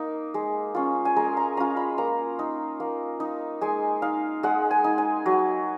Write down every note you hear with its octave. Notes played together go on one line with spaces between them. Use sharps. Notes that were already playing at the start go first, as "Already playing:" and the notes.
Already playing: A#3 D#4
G#3
C#4 F4
G#5
G#3 A#5
A#5
C#4 F4 A#5
B5
A#3 A#5
D#4
A#3
D#4
G#3 G#5
D#4 F5
G#3 F#5
G#5
D#4
G#5
F#3